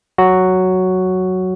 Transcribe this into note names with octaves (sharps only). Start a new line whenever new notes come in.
F#3 F#4